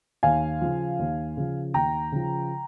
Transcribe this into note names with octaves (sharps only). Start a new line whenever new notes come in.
D#2 F5 G#5
C#3 F3
D#2
C#3 F3
D#2 G5 A#5
C#3 F3